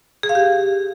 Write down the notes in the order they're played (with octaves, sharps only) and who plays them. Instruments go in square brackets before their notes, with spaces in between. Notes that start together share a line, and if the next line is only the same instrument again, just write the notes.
[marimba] G#4
F5
G4